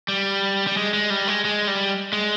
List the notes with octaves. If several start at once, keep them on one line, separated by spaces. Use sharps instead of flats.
G3
G3
G#3
G#3
G3
G#3
G#3
G3
G#3